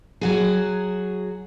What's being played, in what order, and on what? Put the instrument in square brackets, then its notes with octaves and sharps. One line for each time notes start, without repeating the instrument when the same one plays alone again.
[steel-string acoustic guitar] F#3 F#4 G#4